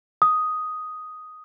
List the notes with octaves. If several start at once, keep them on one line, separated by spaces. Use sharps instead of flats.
D#6